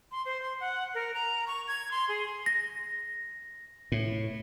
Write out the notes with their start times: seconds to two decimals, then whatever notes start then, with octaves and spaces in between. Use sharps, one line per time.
0.12 C6
0.25 C5
0.42 C6
0.60 F#5
0.95 A#4
1.14 A#5
1.47 C#6
1.68 G#6
1.91 C6
2.09 G#4
2.46 A#6
3.92 A2